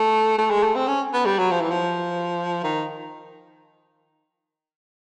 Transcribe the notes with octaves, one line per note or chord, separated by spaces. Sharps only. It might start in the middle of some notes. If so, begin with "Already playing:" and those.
Already playing: A3
A3
G#3
A3
C4
C#4
B3
G3
F#3
F3
E3
F3
D#3